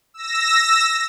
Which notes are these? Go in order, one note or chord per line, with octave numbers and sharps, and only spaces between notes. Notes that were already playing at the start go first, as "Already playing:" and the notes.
E6 A#6